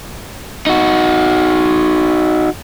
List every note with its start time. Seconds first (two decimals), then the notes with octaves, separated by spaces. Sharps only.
0.67 D#4 F#4